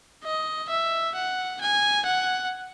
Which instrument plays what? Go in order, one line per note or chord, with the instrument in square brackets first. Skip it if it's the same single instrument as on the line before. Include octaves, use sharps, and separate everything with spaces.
[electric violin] D#5
E5
F#5
G#5
F#5